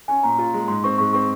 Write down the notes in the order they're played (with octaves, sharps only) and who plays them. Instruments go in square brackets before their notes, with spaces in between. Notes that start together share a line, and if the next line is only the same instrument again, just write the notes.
[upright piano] C#4 [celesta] G#5
[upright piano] A#2 [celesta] A#5
[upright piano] F4
G#3
[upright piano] G#2 [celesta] C6
[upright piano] C4 [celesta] C#6
[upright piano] G#2 [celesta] C#6
[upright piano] C4 [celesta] C#6